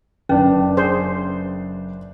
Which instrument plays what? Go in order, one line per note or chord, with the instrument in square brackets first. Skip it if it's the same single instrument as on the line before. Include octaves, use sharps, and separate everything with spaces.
[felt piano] F#1 [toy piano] C#4 [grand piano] D4 B4
[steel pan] G#4 C5